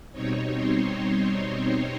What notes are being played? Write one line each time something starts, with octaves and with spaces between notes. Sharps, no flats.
B2 G3 C4 D#4 C#5
C5